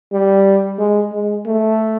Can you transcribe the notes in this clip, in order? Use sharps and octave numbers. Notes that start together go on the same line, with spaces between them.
G3
G#3
G#3
A3